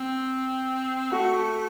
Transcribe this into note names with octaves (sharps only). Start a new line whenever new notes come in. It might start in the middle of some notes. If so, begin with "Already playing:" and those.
Already playing: C4
A3 F#4